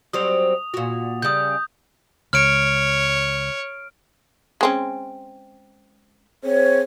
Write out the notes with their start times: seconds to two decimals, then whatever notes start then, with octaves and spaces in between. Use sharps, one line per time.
0.13 F#3 G3 C4 D#6 F7
0.74 A#2 F#4
1.22 C#3 G3 D#6 G6
2.33 C#2 C#5 F6 D7
4.61 G#3 C4 C#4
6.44 C4 G#4 C5 C#5